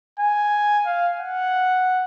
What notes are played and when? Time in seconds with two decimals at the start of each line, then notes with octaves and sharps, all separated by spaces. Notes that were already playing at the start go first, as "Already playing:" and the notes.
0.20 G#5
0.86 F5
1.21 F#5